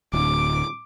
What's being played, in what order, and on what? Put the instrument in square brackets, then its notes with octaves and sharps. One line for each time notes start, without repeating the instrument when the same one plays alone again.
[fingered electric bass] D1 [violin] D6